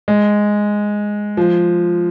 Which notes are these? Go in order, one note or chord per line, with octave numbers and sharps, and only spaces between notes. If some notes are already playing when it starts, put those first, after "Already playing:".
G#3
F3